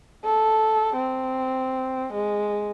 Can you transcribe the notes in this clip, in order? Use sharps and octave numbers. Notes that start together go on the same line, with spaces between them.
A4
C4
G#3